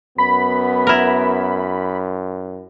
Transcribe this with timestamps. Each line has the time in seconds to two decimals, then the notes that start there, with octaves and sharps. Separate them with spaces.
0.18 F#2 B3 B5
0.87 E4 A#4